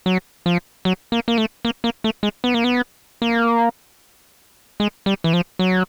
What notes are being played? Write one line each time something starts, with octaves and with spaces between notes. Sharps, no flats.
F#3
F3
F#3
A#3
A#3
A3
A#3
A#3
A3
G#3
B3
A#3
B3
A#3
G#3
G3
E3
F3
F#3